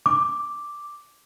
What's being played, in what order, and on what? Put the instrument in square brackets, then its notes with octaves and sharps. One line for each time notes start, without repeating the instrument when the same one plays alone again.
[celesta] D6